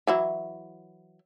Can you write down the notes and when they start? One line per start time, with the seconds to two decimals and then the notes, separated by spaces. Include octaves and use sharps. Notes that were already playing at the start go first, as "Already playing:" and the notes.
0.07 E3 F#3 E4